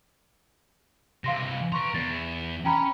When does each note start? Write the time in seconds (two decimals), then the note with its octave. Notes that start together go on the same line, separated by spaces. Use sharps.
1.24 C3 E3 F5 C6 A#6
1.72 B4 A#5 C6 C#6
1.94 E2 A6
2.65 C#4 G5 A#5 B5